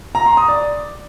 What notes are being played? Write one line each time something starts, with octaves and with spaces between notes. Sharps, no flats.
A#5
C6
D#6
D5